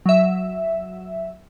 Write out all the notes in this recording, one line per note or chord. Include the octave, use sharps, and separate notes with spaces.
F#3 E5